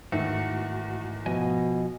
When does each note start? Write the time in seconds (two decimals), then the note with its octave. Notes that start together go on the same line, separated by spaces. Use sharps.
0.12 E2 G#2 D#3 A3 F#4 E5
1.26 B2 F3 D#5 G#5